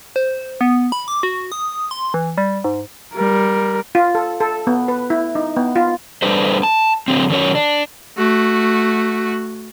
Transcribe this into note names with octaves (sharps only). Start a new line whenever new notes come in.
C5
B3
B5
D6
F#4
D#6
C6
E3
G3
G#2
G3 A#4
F4
A4
A4
B3
B4
E4
D#4
B3
F4
G3 D4 A4 B4 C5
A5
D3 F#3 C4
D#3 F#3 C#4 A#4 C#5
D4
A3 F#4